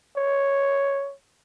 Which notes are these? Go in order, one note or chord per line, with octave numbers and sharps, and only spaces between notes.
C#5